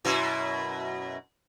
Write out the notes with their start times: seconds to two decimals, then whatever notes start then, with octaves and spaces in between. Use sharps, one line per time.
0.05 F#2 B2 E4